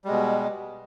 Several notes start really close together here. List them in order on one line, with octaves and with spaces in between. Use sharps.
G3 G#3 B2